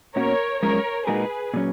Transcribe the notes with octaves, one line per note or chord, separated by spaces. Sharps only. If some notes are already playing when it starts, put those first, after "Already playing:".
B2 A#3 C#4 F#4 A#4 C#5
F#2 F3 G#3 C#4 A#4 C#5
A#2 G#3 D#4 F#4 G#4 A#4 B4
A#2 F#3 C#4